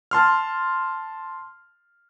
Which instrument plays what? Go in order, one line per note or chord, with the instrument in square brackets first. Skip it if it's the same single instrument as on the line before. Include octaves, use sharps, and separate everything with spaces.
[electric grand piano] A5 C6 F6